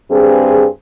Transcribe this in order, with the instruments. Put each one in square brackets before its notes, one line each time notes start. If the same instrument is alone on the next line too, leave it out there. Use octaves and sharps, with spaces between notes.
[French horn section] G2 C4 G#4